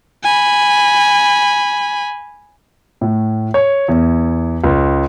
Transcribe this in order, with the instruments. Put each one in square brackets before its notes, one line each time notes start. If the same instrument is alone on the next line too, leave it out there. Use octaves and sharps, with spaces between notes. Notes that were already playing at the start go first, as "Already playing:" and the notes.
[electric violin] G#5 B5
[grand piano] A2
C#5
E2
C#2